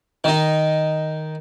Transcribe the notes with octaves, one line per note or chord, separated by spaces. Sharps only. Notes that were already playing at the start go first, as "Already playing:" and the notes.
D#3 D#4